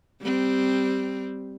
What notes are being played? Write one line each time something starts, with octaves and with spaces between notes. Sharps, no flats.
G3 C4